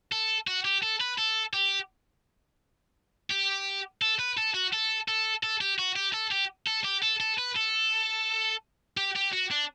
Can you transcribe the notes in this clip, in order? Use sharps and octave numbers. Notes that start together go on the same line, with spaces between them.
A4
F#4
G4
A4
B4
A4
G4
G4
A4
B4
A4
F#4
A4
A4
A4
G4
F#4
G4
A4
G4
A4
G4
A4
A4
B4
A4
G4
G4
F#4
D4